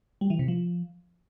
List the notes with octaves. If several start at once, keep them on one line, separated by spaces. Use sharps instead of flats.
G3
E3
C3
F3